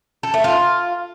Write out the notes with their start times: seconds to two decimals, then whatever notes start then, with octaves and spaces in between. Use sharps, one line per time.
0.23 A4
0.34 A3
0.44 F4